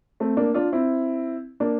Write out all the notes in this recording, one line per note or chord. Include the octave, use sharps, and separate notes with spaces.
A3 C4
A#3 D4
D4 F4
C4 E4
A#3 D4